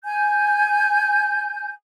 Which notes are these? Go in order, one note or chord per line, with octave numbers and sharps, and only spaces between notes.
G#5 G6